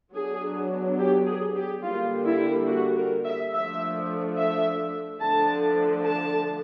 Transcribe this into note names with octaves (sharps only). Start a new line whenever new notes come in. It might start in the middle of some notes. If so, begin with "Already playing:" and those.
F#3 B3 D4 G#4
G4
G#4
G4
D3 G3 A#3 F4
E4
F#4
A#4
E5
F3 A3 D4 E5
E5
D3 F3 A3 D4 A5
A5